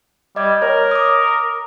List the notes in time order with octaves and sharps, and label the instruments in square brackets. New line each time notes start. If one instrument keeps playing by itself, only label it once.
[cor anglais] G3 [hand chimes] D#5 D6 G#6
[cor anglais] A#4 [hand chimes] C#5
[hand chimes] D6 D#6